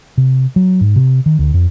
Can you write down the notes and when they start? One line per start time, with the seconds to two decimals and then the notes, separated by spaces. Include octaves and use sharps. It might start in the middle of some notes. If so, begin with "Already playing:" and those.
0.18 C3
0.56 F#3
0.81 G#2
0.96 C3
1.26 D#3
1.39 D2
1.54 F2